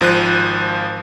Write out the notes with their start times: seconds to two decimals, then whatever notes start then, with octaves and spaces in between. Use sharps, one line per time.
0.01 G#1 F3 C5 F#6 D#7